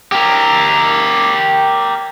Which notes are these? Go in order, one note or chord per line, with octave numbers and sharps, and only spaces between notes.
G4 A#4